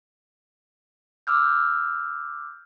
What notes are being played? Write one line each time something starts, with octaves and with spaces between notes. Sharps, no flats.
D6 E6 F6 G6